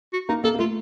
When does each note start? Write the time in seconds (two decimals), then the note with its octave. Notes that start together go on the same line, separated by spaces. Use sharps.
0.13 F#4
0.29 A#3 D#4
0.44 A#3 A4
0.55 A#3
0.59 A3 F4